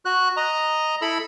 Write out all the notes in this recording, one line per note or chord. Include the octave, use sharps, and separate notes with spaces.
F#4 F#6
D#5 A#5
E4 A4 B5 E6